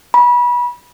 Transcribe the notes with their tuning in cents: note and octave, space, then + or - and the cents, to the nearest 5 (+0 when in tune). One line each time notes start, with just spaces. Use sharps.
B5 -25